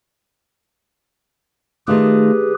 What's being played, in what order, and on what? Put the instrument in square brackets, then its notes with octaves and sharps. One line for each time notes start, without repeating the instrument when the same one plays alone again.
[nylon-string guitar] D#3 A3 F4 [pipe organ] G4 G#4 B4